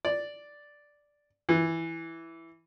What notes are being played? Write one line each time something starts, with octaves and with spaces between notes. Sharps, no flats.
D5
E3